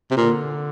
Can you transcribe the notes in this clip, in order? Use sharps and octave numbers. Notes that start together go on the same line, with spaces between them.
C3
A#2 D3